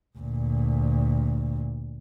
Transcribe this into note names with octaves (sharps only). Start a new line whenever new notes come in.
D2 A#2